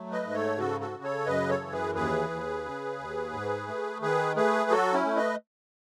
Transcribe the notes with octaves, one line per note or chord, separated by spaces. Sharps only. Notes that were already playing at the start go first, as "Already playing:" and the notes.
Already playing: F#3 A3
B4 D#5
G#2
A4 C#5
C#3 F#4 A4
F#4 A4
C#3
A4 C#5
F#2 B4 D#5
A4 C#5
E3
G#4 B4
D#2 G#4 B4
D#2
C#3
D#2
G#2
A3
D#3 G#4 B4
A3 G#4 B4
F#3 F#4 A4
C#4 E4
A3
B4 D#5